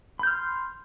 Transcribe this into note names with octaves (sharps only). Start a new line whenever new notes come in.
B5 C6 F6 G6